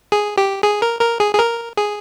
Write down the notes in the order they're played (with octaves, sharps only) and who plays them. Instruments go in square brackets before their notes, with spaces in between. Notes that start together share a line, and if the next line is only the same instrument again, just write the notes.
[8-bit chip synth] G#4
G4
G#4
A#4
A#4
G#4
G#4
A#4
G#4